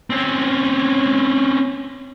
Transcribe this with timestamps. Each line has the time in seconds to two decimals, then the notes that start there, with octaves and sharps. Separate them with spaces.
0.10 C4 C#4